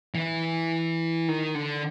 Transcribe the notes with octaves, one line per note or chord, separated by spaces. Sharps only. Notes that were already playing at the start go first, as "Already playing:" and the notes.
E3
D#3
D3